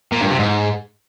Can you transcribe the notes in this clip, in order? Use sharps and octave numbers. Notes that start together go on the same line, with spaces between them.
A#2
G2
C3
G#2